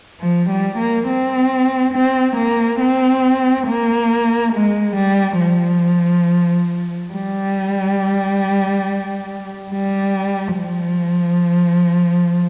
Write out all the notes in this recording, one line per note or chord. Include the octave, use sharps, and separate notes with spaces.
F3
G3
A#3
C4
C4
A#3
C4
A#3
G#3
G3
F3
G3
G3
F3